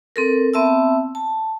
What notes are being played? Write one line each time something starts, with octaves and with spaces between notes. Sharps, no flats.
C4 A4 A#4
B3 C4 E5 A5 E6
A5